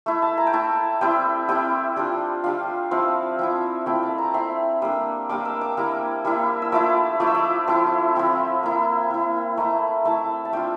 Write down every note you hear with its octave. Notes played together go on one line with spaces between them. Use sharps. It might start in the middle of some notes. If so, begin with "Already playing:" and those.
A3 E4
A5
A#5
G5
A3 E4 A5
G3 C4 E4 G5
G3 C4 E4 G5
G3 D4 F4
G3 D4 F4 F5
F3 C4 E4 F5
F3 C4 E4
A3 C4 E4 G5
A5
A#5
A3 C4 E4 C6
G3 A#3 D4 E6
G3 A#3 D4 D6
E6
D6
G3 A#3 E4
G3 A#3 E4
E6
F3 A3 E4 D6
F3 A3 E4 D6
E6
D6
F3 C4 E4 C6
F3 C4 E4
A#3 E4
A#3 E4
A3 E4 A#5
A3 E4 A5
A5
A3 D4 F4 G5